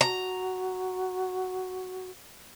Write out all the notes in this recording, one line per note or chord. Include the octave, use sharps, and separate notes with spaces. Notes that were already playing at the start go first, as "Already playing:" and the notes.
F#4 A#5